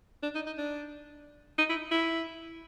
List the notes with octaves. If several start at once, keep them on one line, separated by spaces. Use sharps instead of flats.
D4
D#4
D#4
D4
D#4
E4
E4